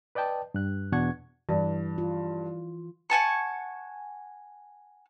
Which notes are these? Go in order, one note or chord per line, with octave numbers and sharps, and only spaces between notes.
B4 D5 D#5 G5 A5
G2 F#6
E2 B2 D4 F#5 C#6 G#6
G2 E3
F4
F#5 G#5 A5 C#6